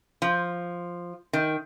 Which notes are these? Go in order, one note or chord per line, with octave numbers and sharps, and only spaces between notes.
F3
D#3